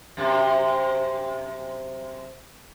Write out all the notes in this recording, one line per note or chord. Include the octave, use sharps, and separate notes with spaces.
F#2 C3